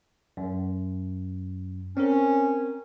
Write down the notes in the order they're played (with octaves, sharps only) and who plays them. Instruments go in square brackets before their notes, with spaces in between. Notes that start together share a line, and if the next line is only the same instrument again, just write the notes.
[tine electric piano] F#2
[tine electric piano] C4 A#4 [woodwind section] C#4